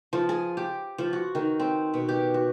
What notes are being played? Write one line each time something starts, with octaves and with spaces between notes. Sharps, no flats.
F3
G#4
G4
F3
F#4
D#3
C4
B2
G4
F#4